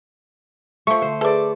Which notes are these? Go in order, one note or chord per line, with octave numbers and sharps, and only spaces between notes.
F3 A3 C#6
D3 C5
G#4 A4 B4 D5 E5